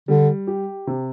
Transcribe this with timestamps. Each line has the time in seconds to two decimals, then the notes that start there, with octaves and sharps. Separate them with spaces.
0.08 D3 G3
0.47 G4
0.87 C3